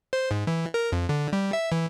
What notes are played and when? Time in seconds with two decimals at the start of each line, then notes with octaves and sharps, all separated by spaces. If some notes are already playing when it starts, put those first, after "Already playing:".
0.13 C5
0.31 G#2
0.47 E3
0.74 A#4
0.92 F2
1.09 D3
1.33 G3
1.53 E5
1.72 E3